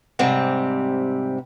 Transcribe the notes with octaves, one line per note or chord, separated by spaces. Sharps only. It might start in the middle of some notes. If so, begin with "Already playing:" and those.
G#2 C3 G3 C4